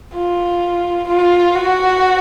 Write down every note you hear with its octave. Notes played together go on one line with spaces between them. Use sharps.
F4
F4
F#4